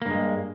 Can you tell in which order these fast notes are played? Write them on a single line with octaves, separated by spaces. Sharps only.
A#3 G2 G#3